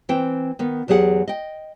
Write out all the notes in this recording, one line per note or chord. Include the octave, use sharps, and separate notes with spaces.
E3 C4 G5
D#3 B3
E2 F#3 G4 G#4 F#5
D#5 G5